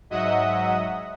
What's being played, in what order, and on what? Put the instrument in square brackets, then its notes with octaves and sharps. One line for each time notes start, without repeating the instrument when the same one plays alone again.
[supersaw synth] G#2 F#3 D#5 E5 F#5 D#6